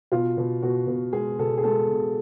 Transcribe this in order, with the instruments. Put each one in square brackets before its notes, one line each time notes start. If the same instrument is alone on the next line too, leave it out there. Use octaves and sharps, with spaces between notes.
[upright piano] B2 F4
B2
B2 F#4
B2
G#3 G#4
B2 A4
G#4
G#3 A4
B2